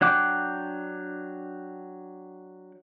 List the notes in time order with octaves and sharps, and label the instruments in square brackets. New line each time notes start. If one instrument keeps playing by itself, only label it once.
[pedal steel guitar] F#3 D4 F#5 G5 D6